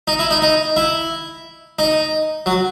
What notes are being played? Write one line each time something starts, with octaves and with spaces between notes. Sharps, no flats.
D#4
E4
D#4
D#4
E4
D#4
F#3